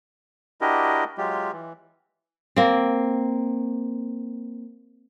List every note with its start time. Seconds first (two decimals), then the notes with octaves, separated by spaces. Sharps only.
0.61 D4 E4 F#4 G4 A#4 D#5
1.18 F#3 G#3 F4 G4
1.52 E3
2.56 A#3 C4